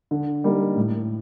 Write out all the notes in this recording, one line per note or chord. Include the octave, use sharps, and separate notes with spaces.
D3
G3 A#3 D#4
A2